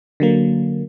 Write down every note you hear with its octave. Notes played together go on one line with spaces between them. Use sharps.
D3 F#3 A#3